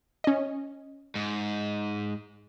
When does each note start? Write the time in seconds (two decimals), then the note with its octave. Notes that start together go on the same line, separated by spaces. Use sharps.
0.24 C#4 D#5
1.15 G#2